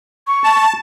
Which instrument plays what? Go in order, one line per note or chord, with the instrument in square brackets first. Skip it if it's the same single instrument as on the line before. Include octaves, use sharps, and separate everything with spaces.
[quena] C#6
[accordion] A5